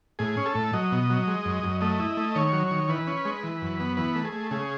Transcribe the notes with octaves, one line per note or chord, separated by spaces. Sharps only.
A2 G#4
C#4
A4
A2
F#3 D#5
B2
F#3
G#3
F#2
F#2
A3 D#5
E4
A3
D#3 C#5
F#3
D#3
E3 B4
C#4
G#3
E3
F#2
B3
E3 B4
A3
G#4
A3
C#3 G#4